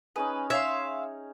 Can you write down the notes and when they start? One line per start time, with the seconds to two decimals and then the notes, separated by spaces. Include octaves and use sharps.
0.16 C#4 D#4 G#4 B4
0.50 C#5 E5 F5 C6